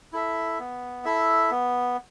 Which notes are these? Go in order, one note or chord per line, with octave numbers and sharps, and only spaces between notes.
E4 A4 E5
B3
E4 A4 E5
B3